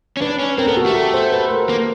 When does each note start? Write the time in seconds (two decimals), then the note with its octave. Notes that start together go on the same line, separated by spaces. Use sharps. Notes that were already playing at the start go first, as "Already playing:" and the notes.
0.17 C#4
0.21 D4 B4
0.39 C#4
0.58 C4 A#4
0.67 B3 A4
0.77 F#4
0.86 A3 G4
0.95 A4
1.14 C5
1.32 B4
1.51 A#4
1.69 A#3 A#4